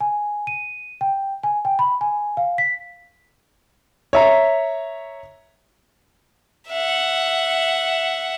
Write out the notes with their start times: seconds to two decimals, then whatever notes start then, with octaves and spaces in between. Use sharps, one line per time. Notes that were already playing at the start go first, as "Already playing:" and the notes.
0.01 G#5
0.47 D#7
1.01 G5
1.43 G#5
1.65 G5
1.79 B5
2.01 G#5
2.37 F5
2.58 B6
4.13 C#5 E5 A#5
6.70 E5 F#5